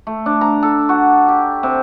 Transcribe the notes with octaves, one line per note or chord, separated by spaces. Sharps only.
A3
D4
A#5
A4
F#4
G4
C3